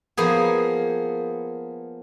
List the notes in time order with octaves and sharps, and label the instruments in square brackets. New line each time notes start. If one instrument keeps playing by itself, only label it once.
[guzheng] F3 A#3 B3 G#4